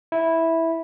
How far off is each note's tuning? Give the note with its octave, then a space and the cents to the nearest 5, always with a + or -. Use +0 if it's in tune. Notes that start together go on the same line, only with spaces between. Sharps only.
E4 -10